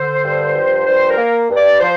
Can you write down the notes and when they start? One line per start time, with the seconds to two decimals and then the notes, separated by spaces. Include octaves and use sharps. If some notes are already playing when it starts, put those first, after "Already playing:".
Already playing: D3 C5
0.24 G2
0.56 F3
0.87 G2 C5
1.10 A#4
1.17 A#3
1.49 G2
1.57 D5
1.80 F3 C5